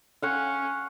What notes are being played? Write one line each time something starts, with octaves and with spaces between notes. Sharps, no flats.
C#4 F5 F#5 C#6